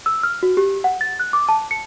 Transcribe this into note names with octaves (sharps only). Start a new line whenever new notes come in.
E6
F6
F#4
G4
F#5
A6
F#6
D6
A5
C#7